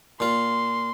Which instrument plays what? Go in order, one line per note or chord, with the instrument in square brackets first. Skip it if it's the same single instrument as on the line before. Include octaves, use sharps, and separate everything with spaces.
[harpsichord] A#2 F4 [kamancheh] C6